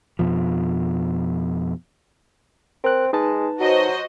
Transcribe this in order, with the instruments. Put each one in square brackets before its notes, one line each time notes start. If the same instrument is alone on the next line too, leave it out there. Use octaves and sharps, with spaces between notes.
[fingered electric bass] F2 B2 F3
[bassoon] C4 [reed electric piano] A#4 F#6
[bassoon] G#3 [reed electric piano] D#4 B4 A5
[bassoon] F#3 [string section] F#4 C5 D#5